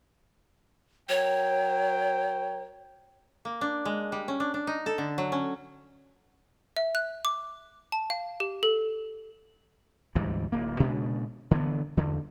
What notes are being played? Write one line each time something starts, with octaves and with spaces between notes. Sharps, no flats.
F#3 A#4 C#5 G5
A#3
D4
G#3
G3
C#4
D4
D4
D#4
A4
D3
F#3
C#4
E5
F#6
D6
A5
F5
G4
A4
D2 G#2 E3 G3
D1 A#3
A#2 C#3 G#3 D4
D3 E3 B3
E2 D3